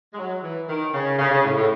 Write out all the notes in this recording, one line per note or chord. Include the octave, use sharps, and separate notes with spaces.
G#3
F#3
E3
D#3
C#3
C#3
C#3
A2
A2